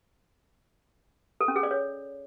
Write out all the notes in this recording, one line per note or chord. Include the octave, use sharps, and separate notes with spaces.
A4
C#4
G#4
D5
C#5